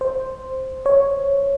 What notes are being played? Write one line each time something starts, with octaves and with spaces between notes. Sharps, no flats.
C5
C#5